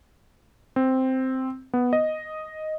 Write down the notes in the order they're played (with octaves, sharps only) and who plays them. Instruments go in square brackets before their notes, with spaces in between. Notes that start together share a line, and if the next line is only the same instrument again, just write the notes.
[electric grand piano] C4
B3
D#5